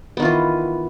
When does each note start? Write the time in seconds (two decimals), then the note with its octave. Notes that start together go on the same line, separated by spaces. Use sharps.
0.17 B3
0.20 D#3
0.22 F4
0.25 E3